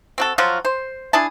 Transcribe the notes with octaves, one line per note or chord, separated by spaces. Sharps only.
C4 F#4 A4
F3 F#3 F4 F#4
C5
D4 E4 G#4 A5